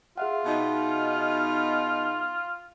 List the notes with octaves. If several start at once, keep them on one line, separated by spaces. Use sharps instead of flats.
F4 G#4 E5 F#5
B2 D#4